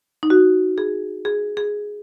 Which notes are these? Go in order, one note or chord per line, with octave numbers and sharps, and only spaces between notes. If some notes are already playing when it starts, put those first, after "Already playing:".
D#4
F#4
G#4
G#4
G#4